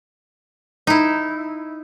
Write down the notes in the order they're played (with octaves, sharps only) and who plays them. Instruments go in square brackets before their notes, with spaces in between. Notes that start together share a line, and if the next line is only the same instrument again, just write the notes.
[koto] D#4 E4